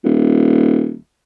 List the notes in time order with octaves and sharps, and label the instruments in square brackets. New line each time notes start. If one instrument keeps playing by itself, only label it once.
[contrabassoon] D#1